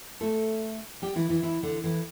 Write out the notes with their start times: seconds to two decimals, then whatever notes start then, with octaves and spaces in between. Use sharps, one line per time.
0.21 A3 A4
1.02 G3 G4
1.16 E3 E4
1.29 E3 E4
1.43 E3 E4
1.63 D3 D4
1.84 E3 E4